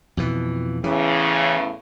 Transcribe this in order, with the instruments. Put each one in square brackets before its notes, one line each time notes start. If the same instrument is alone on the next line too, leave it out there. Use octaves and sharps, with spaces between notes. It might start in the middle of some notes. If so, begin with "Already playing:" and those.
[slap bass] F2 B2 E3
[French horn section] E2 A2 C#3 [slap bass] E3